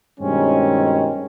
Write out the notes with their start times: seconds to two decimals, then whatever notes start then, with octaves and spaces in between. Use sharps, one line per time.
0.20 G2 B2 D#3 G#3 C4 C#4